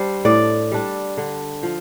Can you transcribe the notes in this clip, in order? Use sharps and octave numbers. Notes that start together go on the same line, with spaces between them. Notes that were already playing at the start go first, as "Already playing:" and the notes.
Already playing: G3 D4 C5
A2 D5
G3 D4
D3
F3